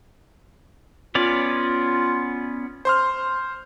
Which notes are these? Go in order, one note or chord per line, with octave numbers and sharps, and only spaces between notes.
B3 C#4 F4 D5
C5 C6 F6